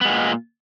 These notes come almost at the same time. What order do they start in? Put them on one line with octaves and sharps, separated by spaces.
B3 G#3 A#2